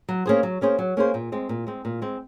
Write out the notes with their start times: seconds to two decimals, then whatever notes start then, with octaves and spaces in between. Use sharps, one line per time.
0.08 F#3
0.26 A#3 C#4 G#4 C5
0.43 F#3
0.61 A#3 C#4 G#4 C5
0.79 F#3
0.97 A#3 C#4 G#4 C5
1.14 A#2
1.32 G#3 C4
1.49 A#2
1.67 G#3 C4
1.85 A#2
2.02 G#3 C4